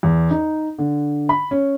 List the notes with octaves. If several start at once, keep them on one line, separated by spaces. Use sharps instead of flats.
E2
D#4
D3
B5
C#4